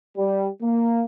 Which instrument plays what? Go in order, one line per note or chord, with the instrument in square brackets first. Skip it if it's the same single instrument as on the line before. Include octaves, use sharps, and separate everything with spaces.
[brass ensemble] G3
A#3